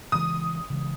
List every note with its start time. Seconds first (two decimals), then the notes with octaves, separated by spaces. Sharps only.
0.12 C#3 E3 G#3 D#6
0.70 C#3 E3 G#3